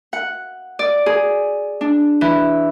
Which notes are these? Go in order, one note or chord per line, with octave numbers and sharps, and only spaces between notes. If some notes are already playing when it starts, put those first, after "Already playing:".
F#5
D5
G#4
D4
E3